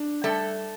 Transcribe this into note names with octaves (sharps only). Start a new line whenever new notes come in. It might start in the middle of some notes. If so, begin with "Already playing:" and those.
Already playing: D4
G3 A3 A4